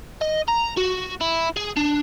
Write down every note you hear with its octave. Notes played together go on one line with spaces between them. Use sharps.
D#5
A#5
F#4
E4
G#4
D4